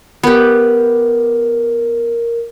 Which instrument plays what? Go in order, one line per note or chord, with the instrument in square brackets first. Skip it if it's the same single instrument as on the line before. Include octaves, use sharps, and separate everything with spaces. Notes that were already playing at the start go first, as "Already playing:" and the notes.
[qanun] B3 G4 [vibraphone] A#4